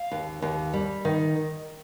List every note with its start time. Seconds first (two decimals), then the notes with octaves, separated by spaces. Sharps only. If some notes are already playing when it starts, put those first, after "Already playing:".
Already playing: F5
0.11 D#2
0.42 D#2
0.73 G3
1.05 D#3